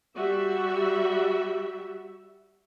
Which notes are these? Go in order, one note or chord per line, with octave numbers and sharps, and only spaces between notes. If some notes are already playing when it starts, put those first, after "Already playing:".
G3 F#4 E5